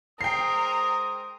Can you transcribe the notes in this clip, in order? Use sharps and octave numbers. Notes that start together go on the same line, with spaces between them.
G#3 A#4 C5 G5 D#6 C7